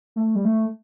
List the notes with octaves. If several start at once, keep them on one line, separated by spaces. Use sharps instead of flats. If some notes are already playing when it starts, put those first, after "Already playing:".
A3
G3
A3